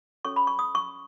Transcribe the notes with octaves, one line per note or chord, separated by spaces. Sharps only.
C#4 F#4 A4 C#5 C#6
B5
C#6
D#6
C#6